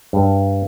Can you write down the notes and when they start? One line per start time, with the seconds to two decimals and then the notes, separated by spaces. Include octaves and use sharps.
0.13 G2